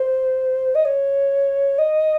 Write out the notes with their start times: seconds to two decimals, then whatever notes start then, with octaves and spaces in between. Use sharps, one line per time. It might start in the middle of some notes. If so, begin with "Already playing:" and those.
Already playing: C5
0.75 D#5
0.85 C#5
1.78 D#5